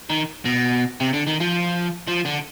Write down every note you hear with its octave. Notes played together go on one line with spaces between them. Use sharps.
D#3
B2
C3
D3
D#3
F3
F3
D3